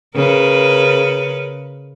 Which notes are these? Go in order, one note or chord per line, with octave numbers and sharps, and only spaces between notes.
C#3 A#4 B4